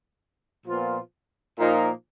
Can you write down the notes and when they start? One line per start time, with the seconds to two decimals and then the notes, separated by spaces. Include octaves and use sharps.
0.66 A#2 F3 B3 F4
1.58 A#2 F3 A#3 D#4